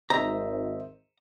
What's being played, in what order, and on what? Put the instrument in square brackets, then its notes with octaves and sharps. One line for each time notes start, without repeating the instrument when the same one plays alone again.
[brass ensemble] G#1 [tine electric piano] C5 D#5 E5 [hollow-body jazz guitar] A#5